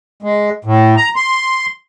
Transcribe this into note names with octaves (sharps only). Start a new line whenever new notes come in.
G#3
A2
A#5
C6